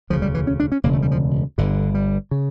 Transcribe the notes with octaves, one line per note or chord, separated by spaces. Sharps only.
E1 D2 C#3 F3
G3
E3
C#4
D4
C#4
E1 D2 C#3 A#3
A3
G3
F3
G1 G2 D3
G3
C#3